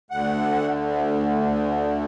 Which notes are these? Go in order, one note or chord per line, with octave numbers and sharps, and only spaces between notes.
D2 D3 F#5